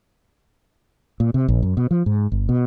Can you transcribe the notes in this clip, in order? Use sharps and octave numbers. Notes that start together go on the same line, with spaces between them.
A#2
C3
A#1
F#2
B2
F3
G#2
G1
B2